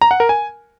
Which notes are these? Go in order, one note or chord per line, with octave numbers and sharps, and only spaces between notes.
A#5
F#5
A#4
G#5